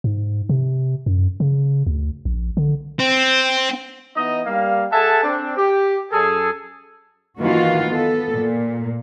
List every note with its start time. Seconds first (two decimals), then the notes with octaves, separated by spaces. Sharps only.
0.04 G#2
0.49 C3
1.06 F#2
1.40 C#3
1.87 D2
2.25 A#1
2.57 D3
2.99 C4
4.16 E3 B3 D#4 D#5
4.45 G3 A#3 F5
4.92 G#4 A4 E5 F#5 G#5 A5
5.23 C4 D4
5.57 G4
6.12 F#2 G#4 A4
7.40 D#3 E3 A#3 F4 F#4
7.91 B3 A4
8.34 A#2